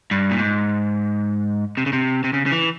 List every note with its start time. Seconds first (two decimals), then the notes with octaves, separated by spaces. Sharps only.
0.11 G2
0.31 A#2
0.39 G#2
1.77 C3
1.86 C#3
1.93 C3
2.24 C3
2.33 C#3
2.46 C#3
2.52 E3